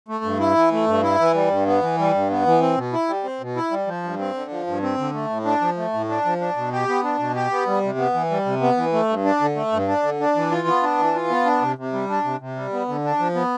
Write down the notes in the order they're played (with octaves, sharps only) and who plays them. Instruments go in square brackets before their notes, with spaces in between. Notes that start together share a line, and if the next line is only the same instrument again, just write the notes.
[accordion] A3
G2
E4
E3
A3
G2
E4
E3
G3
G2
B3
E3
G3
G2
B3
E3
C4
B2
E4
G3
C4
B2
E4
G3
F3
G2
C4
D3
F3
G2
C4
D3
A3
A2
D4
F3
A3
A2
D4
F3
D4
B2
G4
B3
D4
B2
G4
B3
G3
C3
B3
E3
G3
C3
B3
E3
A3
G2
D4
D3
A3
G2
D4
D3
D4
E3
F4
B3
D4
E3
F4
B3
D4
C3
C3
G3
D4
C3
C3
G3
B3
D3
D4
F3
B3